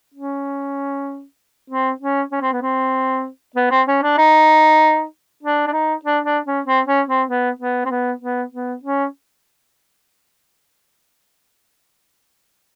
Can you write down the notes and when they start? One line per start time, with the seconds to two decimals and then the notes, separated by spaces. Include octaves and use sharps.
0.14 C#4
1.70 C4
2.00 C#4
2.32 C#4
2.41 C4
2.52 B3
2.62 C4
3.56 B3
3.71 C4
3.88 C#4
4.03 D4
4.18 D#4
5.43 D4
5.67 D4
5.73 D#4
6.05 D4
6.24 D4
6.46 C#4
6.66 C4
6.87 C#4
7.08 C4
7.29 B3
7.59 B3
7.85 C4
7.90 B3
8.21 B3
8.52 B3
8.83 C#4